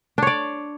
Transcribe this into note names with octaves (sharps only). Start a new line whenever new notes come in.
D4 C#5 D5